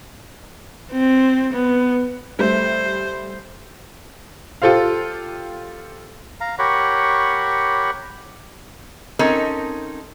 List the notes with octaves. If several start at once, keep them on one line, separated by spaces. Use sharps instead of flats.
C4
B3
G3 A3 C5 E5
F4 G4 A4 C5 F5
F5 A#5
G4 A#4 C#5 F#5 B5 C#6
C4 C#4 D#4 A4 A#4